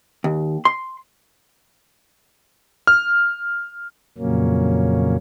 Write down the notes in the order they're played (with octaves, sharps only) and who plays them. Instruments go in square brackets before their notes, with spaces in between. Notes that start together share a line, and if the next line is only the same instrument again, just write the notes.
[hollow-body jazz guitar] D#2
C6
[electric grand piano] F6
[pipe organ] F2 A#2 C#3 F#3 A#3 C#4